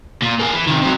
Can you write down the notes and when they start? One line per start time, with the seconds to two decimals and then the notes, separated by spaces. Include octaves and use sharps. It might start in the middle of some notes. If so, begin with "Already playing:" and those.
0.22 A#2
0.39 A#3 G#4
0.53 E3
0.67 C3 D#3
0.81 C3 F#3